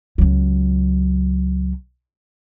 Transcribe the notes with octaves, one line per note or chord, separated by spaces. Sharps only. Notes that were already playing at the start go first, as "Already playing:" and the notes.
C#2 F#3